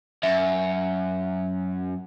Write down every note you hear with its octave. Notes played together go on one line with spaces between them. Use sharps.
F#2 E5